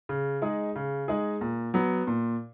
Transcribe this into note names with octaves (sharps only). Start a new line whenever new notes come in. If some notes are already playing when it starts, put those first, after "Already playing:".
C#3
G#3 D#4 G#4
C#3
G#3 D#4 G#4
A#2
F#3 B3
A#2